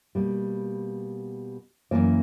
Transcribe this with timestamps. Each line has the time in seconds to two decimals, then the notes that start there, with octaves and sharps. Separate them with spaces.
0.15 B2 G3 A#3
1.91 F#2 C#3 E3 A#3 D5